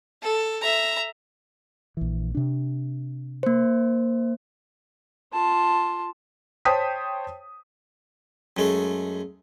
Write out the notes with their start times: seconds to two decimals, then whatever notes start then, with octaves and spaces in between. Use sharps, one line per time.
0.22 A4
0.62 E5 A#5
1.97 A#1 E3
2.35 C3 D4
3.43 A#3 C5
5.33 F4 A5
6.65 C5 C#5 G5 A5 D#6 B6
8.57 F#2 G#3 A3